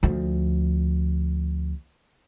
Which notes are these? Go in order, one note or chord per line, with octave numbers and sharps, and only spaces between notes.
D2 F3